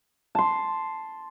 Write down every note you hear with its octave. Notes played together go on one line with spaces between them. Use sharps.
A5 C6